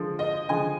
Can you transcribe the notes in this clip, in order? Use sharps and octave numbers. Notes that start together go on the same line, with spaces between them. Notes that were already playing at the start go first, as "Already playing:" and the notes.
Already playing: D3 F3 G#3
D#5
D3 F3 G#3 G#5